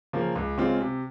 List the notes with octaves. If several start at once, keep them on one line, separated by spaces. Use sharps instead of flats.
C#3 F3 A#3
C#2
C#3 G#3 C4 F4
C3